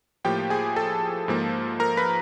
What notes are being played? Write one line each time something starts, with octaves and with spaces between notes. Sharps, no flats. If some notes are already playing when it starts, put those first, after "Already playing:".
A2 F3 A#3 G4 G5
G#4 G#5
A4 A5
G#2 F3 A#3
A#4 A#5
B4 B5